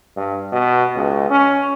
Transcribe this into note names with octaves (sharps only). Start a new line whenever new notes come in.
G2
B2
C#2
C#4